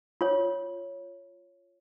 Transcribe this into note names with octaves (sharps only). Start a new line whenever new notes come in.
F4 C#5